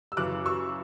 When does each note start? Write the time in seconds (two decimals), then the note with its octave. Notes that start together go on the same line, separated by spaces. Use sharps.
0.12 E6
0.17 F#2 C#3 E3 D6 F#6
0.46 C#6 E6